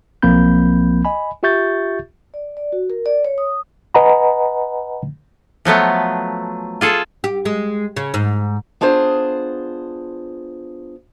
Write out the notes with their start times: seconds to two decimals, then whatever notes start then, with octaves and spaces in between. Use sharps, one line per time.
0.22 B1 F3 A#3 C4 B5 G6
1.05 D#5 G#5 B5
1.43 F4 G4 E5 C#6 G6 A6
2.34 D5
2.57 D5
2.72 F#4
2.90 A#4
3.06 D5
3.25 C#5
3.38 D#6
3.94 B4 D#5 F#5 G#5 A#5 B5
5.65 F3 F#3 A3 B3
6.81 F4 G#4 A4
7.24 G4
7.45 G#3
7.96 C#3
8.14 G#2
8.81 B3 D4 F4 G#4 C5